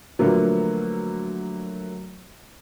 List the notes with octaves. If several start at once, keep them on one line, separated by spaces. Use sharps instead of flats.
D3 F3 F#3 A3 A#3 B4